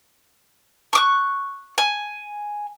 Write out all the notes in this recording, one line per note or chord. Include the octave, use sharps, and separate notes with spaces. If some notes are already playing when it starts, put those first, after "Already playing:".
C#6 D6 F#6
G#5